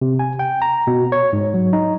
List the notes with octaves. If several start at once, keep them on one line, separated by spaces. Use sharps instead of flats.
C3
G#5
G5
A#5
B2
C#5
G#2
F#3
D#4